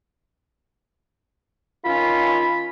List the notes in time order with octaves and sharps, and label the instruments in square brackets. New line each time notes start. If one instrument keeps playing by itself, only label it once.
[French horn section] D#3 C#4 F4 [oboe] B5